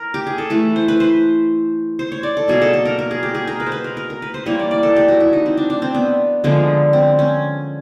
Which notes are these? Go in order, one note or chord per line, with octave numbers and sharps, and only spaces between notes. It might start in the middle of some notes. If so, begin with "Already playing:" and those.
Already playing: A#4
G4
G#4
A4
E3 A3 B4
C5
B4
C5
C5
C#5
D5
A4
B2 F#3 A#3 G#4
A4
A4
A#4
A#4
G#4
G4
G#4
A#4
B4
C5
B4
A#4
A#4
A#4
B4
C5
E3 G3 A#3 C#5
D5
D5
A4
G4
F#4
E4
D#4
C4
D4
D4
C4
B3
D3 F3 G#3 B3
C4
C#4